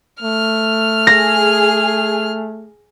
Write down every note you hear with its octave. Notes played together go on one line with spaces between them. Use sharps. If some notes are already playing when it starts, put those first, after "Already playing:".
A3 F6
G#4 A#6